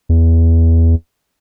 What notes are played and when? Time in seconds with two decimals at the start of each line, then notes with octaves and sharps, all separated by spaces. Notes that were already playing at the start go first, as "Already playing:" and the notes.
0.09 E2